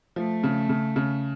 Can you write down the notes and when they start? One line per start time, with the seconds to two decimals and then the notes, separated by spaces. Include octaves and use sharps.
0.16 F3 A3
0.44 C#3
0.69 C#3
0.96 C#3